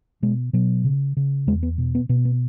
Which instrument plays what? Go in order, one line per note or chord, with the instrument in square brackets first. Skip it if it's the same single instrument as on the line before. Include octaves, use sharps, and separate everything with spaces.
[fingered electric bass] B2 G#3
B2 F#3
C#3
C#3
E2 G#3
B3
B2
B3
B2 B3
B3